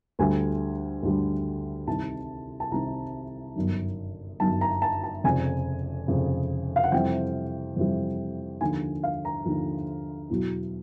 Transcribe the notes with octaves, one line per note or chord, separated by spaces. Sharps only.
D2 D3 G3 G#5
D2 D3 G3
C2 C3 D#3 A5
A5
C2 C3 D#3 A#5
G1 F#2 D#3 F#3
G1 F#2 D#3 F#3 A5
A#5
A5
A5
F1 F2 C#3 G#5
F1 F2 C#3
F5
F#5
F2 C3 E3 G3 G5
F2 C3 E3 G3
D#2 D3 F3 G#5
F5
A#5
D#2 D3 F3
E2 B2 F#3